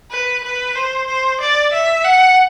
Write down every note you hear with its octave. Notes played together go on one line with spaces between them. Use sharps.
B4
B4
C5
C5
D5
E5
F#5